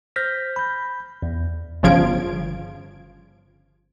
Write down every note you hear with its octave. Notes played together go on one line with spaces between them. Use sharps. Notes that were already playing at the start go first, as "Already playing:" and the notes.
C5 F6 G6 A#6 B6
B5 G6
E2
G1 C#3 F3 F4 G#6 D7